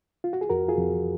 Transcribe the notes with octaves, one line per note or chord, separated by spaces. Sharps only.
F4
F#4
G#4
F2 F#4 A#4
F4 G#4
F2